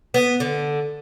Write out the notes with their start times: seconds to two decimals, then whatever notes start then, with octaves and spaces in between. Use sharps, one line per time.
0.14 B3
0.40 D3